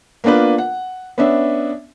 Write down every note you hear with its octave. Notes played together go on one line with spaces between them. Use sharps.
A#3 B3 D4 F4 B4
F#5
B3 C#4 D4 E5